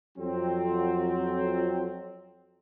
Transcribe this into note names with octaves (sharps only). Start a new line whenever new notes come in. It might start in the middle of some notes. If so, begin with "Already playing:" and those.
F2 F#3 C4